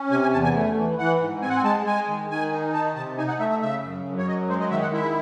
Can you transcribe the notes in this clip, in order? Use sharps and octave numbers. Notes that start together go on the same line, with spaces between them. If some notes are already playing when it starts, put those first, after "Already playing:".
Already playing: C#4
C3 G#5
G#5
E2 A5
G#5
A3
E3
E3 F#5
G#2
C4 G#5
F#5
G#5
G#3 A5
G#3 G#5
D#3
D#3 G#5
D#4
D#3 A5
C3 A5
D#4 G#5
F#5
A3 E5
E5
C#3 E5
F#2
F#2
C#5
F#3 D#5
G#3 C5
D#5
D#3 E5
F#5
E4 E5